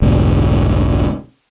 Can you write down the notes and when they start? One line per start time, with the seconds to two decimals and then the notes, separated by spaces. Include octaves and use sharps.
0.02 F1 B1 G#2 D3